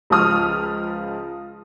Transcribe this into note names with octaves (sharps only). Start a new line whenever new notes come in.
C#2 F3 D#6 F6